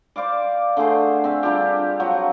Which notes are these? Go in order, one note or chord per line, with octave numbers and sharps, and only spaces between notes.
C5 D5 F5 D6
D3 A3 G#4 C5
C4 G#4 E5 F5
G3 D4 F4 G4
F3 F#3 F#4 F#5